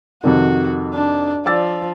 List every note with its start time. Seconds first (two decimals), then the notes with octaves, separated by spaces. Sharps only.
0.24 F2 C3 D#3 F#4
0.94 D4
1.46 F3 D5 E6 A6